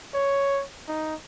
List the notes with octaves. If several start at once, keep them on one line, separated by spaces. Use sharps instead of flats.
C#5
D#4